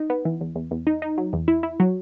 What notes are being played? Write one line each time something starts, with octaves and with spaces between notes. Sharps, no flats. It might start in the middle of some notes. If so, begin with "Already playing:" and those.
Already playing: D#4
B3
E3
E2
E2
E2
D#4
D#4
F#3
E2
E4
E4
F#3